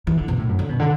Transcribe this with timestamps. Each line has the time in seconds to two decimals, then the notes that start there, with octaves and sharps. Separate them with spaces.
0.07 E3
0.17 D3
0.28 B2
0.38 A2
0.49 F#2
0.59 D3
0.69 B2
0.80 D3